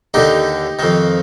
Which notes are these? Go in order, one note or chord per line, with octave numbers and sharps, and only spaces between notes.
D#2 D3 D#4 G4
F2 D#3